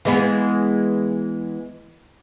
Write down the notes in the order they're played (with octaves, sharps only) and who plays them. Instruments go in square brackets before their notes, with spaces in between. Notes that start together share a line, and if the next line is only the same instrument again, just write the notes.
[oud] E3 G#3 B3